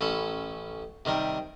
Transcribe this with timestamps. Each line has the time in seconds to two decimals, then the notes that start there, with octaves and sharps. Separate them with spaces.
0.01 A1 C#4 A4 B5
1.05 C3 D#3 G3 A#4